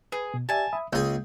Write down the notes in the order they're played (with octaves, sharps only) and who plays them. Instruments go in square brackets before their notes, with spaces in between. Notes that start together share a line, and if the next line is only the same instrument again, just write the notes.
[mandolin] G#4 [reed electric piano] B4
[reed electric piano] B2
[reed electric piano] G4 D5 E5 [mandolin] G#5 A5
[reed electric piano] E5 B5 D#6
[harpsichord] C#2 G#4 [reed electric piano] A#3 [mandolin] G6